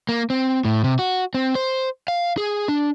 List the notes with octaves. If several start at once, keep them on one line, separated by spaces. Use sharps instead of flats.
A#3
C4
A2
C3
F#4
C4
C5
F5
G#4
D4